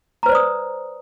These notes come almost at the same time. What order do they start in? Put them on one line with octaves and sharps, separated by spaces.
A#5 B4 C5 D5 D#6